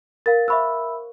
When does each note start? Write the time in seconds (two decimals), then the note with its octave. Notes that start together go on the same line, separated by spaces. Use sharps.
0.26 A#4 F5 A6
0.48 C5 E5 B5 C#6 E6